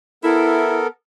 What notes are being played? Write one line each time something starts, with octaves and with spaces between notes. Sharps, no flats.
B3 E4 A4 A#4